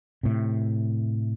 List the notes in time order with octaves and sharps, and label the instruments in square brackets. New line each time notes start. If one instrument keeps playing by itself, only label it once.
[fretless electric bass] A2 C3